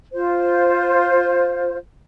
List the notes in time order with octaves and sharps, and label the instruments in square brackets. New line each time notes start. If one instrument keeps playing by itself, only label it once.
[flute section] F4 C5